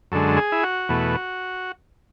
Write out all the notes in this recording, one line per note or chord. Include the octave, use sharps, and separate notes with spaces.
F#2 D3 G#3 A4
G#4
E4
F#4
E2 B2 A3